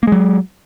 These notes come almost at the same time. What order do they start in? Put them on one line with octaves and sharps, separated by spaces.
A#3 G#3 F#3